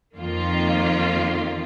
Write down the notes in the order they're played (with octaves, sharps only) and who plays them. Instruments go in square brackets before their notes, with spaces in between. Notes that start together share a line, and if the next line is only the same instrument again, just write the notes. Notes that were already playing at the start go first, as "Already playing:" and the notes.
[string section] F2 D#3 A#3 F4